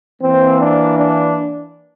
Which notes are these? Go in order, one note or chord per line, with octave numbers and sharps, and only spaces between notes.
E3 A#3 C4
D4
D4